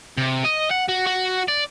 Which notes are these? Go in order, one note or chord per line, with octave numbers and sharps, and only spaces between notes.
C3
D#5
F#5
F#4
F#4
D5